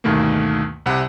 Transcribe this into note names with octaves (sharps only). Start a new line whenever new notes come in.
D2 G2 B2 D#3 A3 A#3
C2 C3 F#5 B5